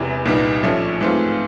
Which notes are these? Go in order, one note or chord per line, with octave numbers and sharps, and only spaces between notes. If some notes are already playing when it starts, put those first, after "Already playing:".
Already playing: E1 E2 C3 E3
C2 A#2 G3 B3 D#4
A#1 A2 F3 A3 C#4
G#2 E3 A3 C4 F4